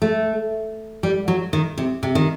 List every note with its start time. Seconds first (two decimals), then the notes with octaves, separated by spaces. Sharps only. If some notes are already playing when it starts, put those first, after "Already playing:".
0.02 A3
1.03 G3
1.28 F#3
1.53 D#3
1.78 C3
2.03 C3
2.15 D#3